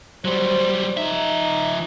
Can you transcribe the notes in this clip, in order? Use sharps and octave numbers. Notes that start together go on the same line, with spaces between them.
F#3 G3 C5
F3 D#4 E5